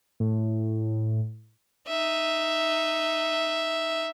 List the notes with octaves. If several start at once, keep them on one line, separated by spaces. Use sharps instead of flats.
A2
D#4 E5